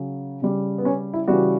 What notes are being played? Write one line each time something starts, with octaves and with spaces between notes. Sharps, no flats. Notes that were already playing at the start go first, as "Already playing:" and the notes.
Already playing: C#3 F#3
C#3 G3
B3
C#4
E4
C#3 E3 G3 F#4